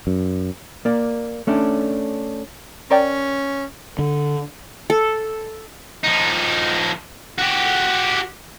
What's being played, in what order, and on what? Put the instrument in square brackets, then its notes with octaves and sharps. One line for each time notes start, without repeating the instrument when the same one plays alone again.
[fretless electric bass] F#2
[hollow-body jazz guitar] A#3 D5
A3 C#4 D4
[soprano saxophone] C#4 [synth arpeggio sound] A#4 D5 G5
[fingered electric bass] D3
[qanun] A4
[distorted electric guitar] F3 D#4
F#4 G4